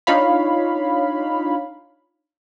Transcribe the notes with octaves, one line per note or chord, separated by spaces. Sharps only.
D4 D#4 F4 C#5 F5 B5